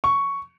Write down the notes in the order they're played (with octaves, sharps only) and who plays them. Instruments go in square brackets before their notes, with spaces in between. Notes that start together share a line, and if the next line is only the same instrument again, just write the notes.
[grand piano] C#6